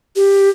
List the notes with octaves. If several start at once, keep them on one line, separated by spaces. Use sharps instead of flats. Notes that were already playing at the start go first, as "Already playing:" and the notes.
G4